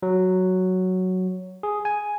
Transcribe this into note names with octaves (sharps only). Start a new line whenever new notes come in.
F#3
G#4
G#5